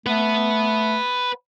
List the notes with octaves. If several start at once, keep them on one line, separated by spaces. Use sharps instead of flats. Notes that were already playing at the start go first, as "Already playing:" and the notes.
A3 B4 F#5